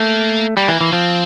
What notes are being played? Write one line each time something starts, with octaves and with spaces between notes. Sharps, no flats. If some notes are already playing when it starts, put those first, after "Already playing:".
Already playing: A3 A#3
G3 A#3
E3
E3
F3 C4